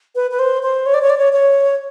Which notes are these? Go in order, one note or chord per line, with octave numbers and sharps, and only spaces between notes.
B4
B4
C5
C5
C#5
D5
C#5
D5
C#5
C#5